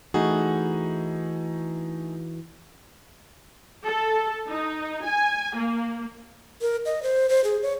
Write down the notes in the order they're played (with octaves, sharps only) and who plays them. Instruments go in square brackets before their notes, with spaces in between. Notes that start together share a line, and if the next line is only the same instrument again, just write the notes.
[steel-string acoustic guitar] E3 F#4 [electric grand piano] A3 D#4 G#4
[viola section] A4
D#4
G#5
A#3
[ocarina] A#4
D#5
C5
C5
G#4
C#5